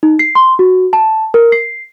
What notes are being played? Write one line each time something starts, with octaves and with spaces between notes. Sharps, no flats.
D#4
C7
C6
F#4
A5
A#4
C7